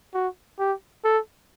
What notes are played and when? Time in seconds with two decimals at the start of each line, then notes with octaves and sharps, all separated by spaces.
0.14 F#4
0.59 G4
1.04 A4